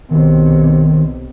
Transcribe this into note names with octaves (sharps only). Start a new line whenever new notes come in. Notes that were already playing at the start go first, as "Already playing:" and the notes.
B1 C3 D#3